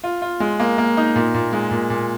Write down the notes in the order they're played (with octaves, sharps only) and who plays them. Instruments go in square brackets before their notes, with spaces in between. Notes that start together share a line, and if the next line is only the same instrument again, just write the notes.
[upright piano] F4
F4
G#3
A#3
A#3
D#4
A#2
A#2
G#3
A#2
A#2